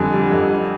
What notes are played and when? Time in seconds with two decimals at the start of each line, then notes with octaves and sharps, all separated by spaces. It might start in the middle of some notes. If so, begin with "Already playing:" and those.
Already playing: F2 D3 G3 G#5
0.12 G3
0.32 F2
0.52 G3